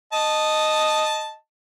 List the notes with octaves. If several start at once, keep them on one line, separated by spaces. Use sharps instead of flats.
D#5 A5